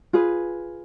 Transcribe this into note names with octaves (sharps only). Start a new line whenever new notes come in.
F4 G#4 B4